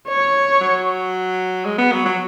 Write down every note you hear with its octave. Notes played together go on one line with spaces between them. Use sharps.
C#5
F#3
G#3
B3
F#3
F#3